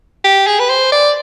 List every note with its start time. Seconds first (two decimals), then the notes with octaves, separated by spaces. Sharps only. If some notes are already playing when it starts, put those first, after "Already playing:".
0.24 G4
0.47 G#4
0.59 B4
0.69 C5
0.92 D5